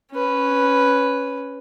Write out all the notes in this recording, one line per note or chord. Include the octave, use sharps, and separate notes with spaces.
C#4 B4